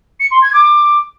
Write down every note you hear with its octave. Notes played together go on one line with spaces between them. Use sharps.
C#7
C6
G#6
D6